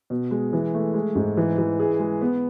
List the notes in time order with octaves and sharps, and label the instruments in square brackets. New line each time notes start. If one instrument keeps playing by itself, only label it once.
[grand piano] B2
G#3
E3
A3
G#3
G#2
E3
E3
G#4
G#3
B3